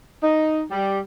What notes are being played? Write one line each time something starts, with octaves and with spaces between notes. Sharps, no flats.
D#4
G3